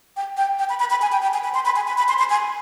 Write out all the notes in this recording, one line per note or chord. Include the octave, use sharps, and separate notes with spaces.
G5
G5
G5
B5
B5
B5
G#5
G5
G5
G#5
B5
C6
B5
G#5
B5
B5
C6
C6
G#5